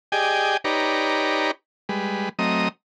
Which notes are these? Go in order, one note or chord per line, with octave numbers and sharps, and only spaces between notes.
G4 G#4 D5 D#5 G5 G#5
D#4 G4 B4 C#5 D5 A#5
G3 G#3 B4
F#3 A3 C4 D#5 A#5 D#6